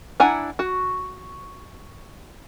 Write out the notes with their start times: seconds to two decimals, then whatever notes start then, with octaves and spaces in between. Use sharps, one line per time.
0.20 D4 E4 F#5 G#5 A#5
0.59 F#4